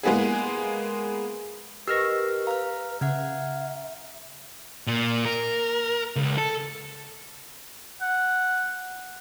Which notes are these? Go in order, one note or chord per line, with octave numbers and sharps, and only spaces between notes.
G#3 A#3 B3 E4 G#4
G4 A#4 B4 D#5 C#6 E6 F6 A#6
F5 A#5 F6
C#3 E5 F#5 F6 G#6
A#2
A#4
C#2
A4
F#5